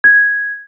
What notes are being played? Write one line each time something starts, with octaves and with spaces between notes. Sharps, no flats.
G#6